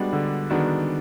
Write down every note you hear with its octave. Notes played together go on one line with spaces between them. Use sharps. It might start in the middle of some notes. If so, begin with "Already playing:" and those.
Already playing: G3 G#3 B3 D4 F#4
D3
D#3 G#3 B3 D4 F#4